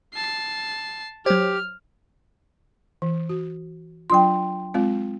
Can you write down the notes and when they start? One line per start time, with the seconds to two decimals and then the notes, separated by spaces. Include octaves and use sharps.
0.14 A5 C7
1.26 F#3 G4 C5 F6
3.02 E3
3.29 F#4
4.10 F#3 D4 F4 G5 C6
4.74 G#3 C4 F4